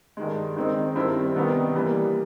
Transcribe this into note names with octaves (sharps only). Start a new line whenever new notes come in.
G2 D#3 G#3
D#3 G#3 C4 D#4
G2 D#3 G3 C4 E4
C3 D#3 G3 B3 D#4
E3 G3 A#3